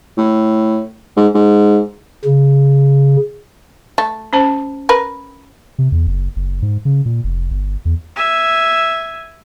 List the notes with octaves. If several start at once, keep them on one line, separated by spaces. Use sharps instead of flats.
A2
G#2
G#2
C#3
A3
C#4 C5 A5
A#4 B4
C3
E2
F#1
F#1
G#2
C#3
A#2
F1
G1
E2
E5 G#5